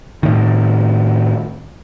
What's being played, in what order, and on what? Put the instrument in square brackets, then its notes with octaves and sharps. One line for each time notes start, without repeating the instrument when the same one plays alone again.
[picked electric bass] A2 D#3